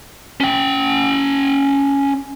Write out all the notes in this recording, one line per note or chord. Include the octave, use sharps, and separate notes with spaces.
C#4 G5